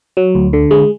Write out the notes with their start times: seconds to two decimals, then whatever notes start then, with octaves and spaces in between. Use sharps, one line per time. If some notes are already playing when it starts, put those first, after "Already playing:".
0.17 F#3
0.35 D2
0.53 D3
0.71 G#3